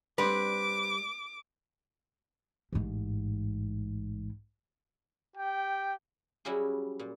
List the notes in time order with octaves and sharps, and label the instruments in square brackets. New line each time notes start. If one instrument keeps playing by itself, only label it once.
[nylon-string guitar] G3 [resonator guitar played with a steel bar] C4 D4 B4 [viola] D6
[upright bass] A1 G#2
[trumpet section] G4 G5
[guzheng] F#3 G3 C#4 E4 F#4 G#4
A#2